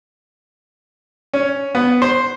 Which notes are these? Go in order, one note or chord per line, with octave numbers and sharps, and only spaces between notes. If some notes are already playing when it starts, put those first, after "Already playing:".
C#4
B3
C5